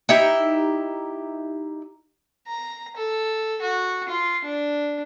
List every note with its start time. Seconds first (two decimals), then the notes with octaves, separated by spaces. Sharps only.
0.09 D#4 E4 G4 E5
2.47 A#5
2.96 A4
3.62 F#4
4.08 F4
4.44 D4